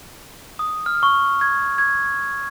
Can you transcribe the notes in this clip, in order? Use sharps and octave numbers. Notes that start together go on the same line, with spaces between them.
D#6
F6
C#6
G#6
G#6